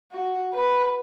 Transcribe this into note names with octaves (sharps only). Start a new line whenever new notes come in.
F#4
B4